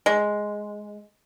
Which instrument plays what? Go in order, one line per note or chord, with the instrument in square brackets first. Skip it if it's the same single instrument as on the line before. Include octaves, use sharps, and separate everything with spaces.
[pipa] G#3